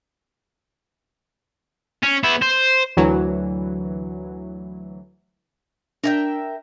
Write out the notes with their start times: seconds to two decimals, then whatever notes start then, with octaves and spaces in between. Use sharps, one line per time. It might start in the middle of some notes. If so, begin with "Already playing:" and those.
2.03 C#4
2.23 B3 E4
2.42 C5
2.97 D2 E3 F#3
6.04 D4 A#4 E5 G5